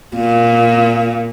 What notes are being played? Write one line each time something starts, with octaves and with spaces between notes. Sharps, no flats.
A#2